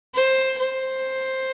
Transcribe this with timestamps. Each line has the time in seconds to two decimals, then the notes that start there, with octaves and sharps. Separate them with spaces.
0.14 C5
0.59 C5